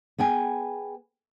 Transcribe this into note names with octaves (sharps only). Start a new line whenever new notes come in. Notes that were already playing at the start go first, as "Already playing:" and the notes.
B3 G#4 G5 G#5